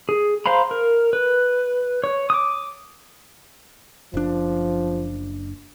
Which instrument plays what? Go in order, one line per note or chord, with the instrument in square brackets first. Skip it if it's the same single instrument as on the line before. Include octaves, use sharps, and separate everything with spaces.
[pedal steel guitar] G#4
C5 F5 A#5 B5
A#4
B4
C#5
D6 D#6
[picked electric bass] F#1 D4 [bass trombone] F3